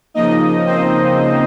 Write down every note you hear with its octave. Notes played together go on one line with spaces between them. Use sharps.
C#3 F3 A#3 D#4 D#5
C4 C5